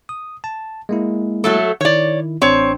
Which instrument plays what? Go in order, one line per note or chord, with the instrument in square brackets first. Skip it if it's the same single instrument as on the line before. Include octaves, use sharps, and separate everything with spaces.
[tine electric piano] D#6
A5
G#3 A#3 E4
[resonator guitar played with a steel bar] F#3 A3 A4
[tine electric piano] D#3 E4 [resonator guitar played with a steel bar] C#5 D5
[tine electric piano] A1 D4 C5 [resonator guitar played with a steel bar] C4 C#5